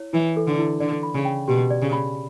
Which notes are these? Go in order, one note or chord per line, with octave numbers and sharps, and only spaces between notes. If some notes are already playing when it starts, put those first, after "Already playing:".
Already playing: E4 C#5
E3 E4
A4
D3
E4
D3 D5
B5
C#3
G5
B2 G4
D5
C#3
B5